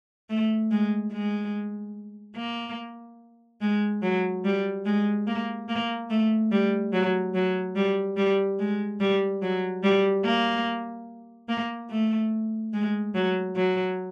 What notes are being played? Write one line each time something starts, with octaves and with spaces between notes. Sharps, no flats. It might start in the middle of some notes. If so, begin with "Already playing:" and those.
A3
G#3
G#3
A#3
G#3
F#3
G3
G#3
A#3
A#3
A3
G3
F#3
F#3
G3
G3
G#3
G3
F#3
G3
A#3
A#3
A3
G#3
F#3
F#3